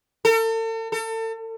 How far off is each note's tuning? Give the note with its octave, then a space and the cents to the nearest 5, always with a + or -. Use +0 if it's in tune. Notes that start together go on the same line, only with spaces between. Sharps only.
A4 +40
A4 +35